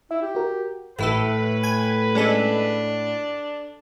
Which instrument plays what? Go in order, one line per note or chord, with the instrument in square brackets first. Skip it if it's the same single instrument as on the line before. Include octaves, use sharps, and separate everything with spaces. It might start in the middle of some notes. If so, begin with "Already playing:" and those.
[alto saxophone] E4 [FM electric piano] E5
[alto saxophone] G4
[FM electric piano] F#4 A#4
[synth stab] A1 E4 A4 [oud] A2 [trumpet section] B4
[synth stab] G#5 G#6
[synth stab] G#3 C#4 A4 [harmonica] D4